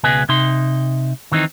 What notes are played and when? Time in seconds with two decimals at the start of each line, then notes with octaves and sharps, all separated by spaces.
0.04 C#2 B2 G#3 G#4 B4
0.29 C3 D#4 C6
1.32 D#3 E3 C4 D#4